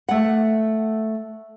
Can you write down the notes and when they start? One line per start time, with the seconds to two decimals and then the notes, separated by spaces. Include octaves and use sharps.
0.09 A3 F#5